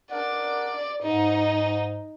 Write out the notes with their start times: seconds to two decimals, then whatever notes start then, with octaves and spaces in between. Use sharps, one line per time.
0.11 D4 A#4 D5 F#5
1.03 G#2 D#4